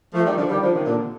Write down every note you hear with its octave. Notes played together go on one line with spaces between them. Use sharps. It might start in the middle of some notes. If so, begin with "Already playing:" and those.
F3 A3
D#3 G3
D3 F3
D#3 G3
D3 F3
C3 D#3
A#2 D3